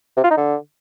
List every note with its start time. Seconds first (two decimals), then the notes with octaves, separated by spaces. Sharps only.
0.17 C3
0.24 F4
0.30 D#4
0.37 D3